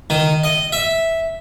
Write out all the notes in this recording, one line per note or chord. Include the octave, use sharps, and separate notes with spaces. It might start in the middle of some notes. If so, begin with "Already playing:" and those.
D#3
D#5
E5